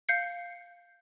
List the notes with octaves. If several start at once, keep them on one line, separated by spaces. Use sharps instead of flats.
F5 G6 C7 C#7